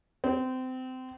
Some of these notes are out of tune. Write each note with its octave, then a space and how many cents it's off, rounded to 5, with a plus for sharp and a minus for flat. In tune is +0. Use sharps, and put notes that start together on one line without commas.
C4 -25